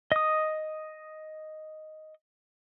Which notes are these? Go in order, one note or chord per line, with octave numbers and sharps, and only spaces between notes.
D#5 D#6